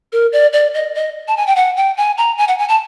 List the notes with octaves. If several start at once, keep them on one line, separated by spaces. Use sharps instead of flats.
A#4
D5
D5
D#5
D#5
A5
G#5
G5
F#5
G5
G#5
A#5
G#5
F#5
G#5
A5